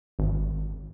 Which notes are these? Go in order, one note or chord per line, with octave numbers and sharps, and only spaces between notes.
G#1